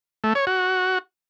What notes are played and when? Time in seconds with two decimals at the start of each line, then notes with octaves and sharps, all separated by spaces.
0.24 A3
0.35 C#5
0.47 F#4